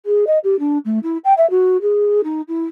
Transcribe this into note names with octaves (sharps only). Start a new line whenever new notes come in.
G#4
D#5
G4
D4
A3
E4
G5
E5
F#4
G#4
D#4
E4